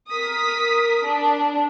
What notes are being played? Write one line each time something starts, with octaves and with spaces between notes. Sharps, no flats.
A#4 D#6 B6
D4